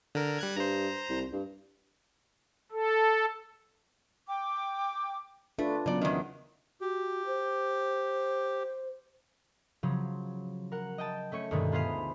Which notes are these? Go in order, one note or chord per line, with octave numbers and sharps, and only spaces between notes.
D3 A#4
G3 F#6 G#6
G2 C5 A#5
C2
G2
A4
G5 D6
A3 D4 F4 B4
A#2 C#3 F#3 B3 D5
E2 D#3
F#4 G4
C5
C#3 F3 F#3
A#4 F#5
D#5 G5 A5
A3 C#4 C#6 C#7
D2 G2 B2 D#3 G#3 A3
B3 F4 G#4 B4 C5 F5